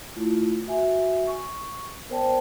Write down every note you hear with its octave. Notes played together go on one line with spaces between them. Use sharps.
A3 E4 F4
F#4 E5 G#5
C#6
B3 A#4 C5 D5 G5 A5